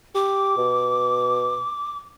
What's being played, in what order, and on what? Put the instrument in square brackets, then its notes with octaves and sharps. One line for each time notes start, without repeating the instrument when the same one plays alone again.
[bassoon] G4 [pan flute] D6
[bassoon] B2